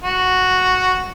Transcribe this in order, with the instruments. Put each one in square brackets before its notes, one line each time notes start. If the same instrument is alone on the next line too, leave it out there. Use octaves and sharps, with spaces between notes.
[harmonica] F#4